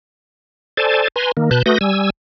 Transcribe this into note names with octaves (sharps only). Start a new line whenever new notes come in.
A4 C5 D5 G#5 A5
B4 G#5 A#5 C6
D#3 A#3
B2 B4 A5 F#6 G6
A3 F#4 B4 D#6 G6 A#6
G3 G#5 E6